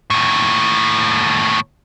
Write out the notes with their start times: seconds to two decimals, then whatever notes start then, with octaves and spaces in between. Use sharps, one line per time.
0.10 D#2 A2